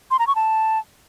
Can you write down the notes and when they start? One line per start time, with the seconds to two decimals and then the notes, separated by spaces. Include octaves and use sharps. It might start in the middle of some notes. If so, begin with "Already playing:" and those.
0.11 C6
0.19 A#5
0.27 C#6
0.35 A5